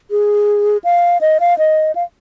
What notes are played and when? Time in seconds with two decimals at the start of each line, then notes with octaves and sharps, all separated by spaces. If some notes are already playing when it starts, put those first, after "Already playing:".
0.11 G#4
0.84 F5
1.21 D#5
1.40 F5
1.58 D#5
1.95 F5